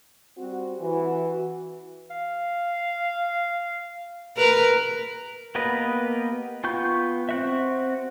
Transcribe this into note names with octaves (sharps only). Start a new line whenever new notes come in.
G3 C4 F#4
E3 F#4
F5
A#4 B4
A#3 B3 G4 B4 D#5
B3 F4 G5 C#6 G6
C4 F#4 E5